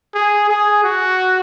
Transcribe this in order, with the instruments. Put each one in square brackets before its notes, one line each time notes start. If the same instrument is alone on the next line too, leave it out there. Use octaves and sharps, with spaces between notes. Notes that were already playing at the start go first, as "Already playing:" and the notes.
[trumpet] G#4
G#4
F#4